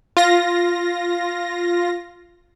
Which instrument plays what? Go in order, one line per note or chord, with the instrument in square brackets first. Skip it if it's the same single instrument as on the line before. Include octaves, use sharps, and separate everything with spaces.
[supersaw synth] F4 A#6